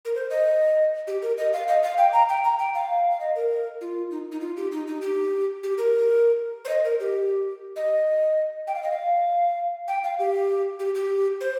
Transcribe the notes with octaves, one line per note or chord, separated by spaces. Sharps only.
A#4
C5
D#5
G4
A#4
D#5
F5
D#5
F5
G5
A#5
G5
A#5
G5
F5
F5
D#5
A#4
F4
D#4
D#4
F4
G4
D#4
D#4
G4
G4
A#4
C5
D#5
A#4
G4
D#5
G5
F5
D#5
F5
G5
F5
G4
G4
G4
C5